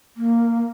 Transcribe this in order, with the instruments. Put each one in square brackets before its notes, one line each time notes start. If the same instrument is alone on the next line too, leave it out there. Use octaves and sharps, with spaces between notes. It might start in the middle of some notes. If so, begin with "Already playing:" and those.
[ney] A#3